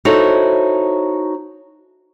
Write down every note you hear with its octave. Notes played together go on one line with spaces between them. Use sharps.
D#4 E4 F#4 A4 C5 C#5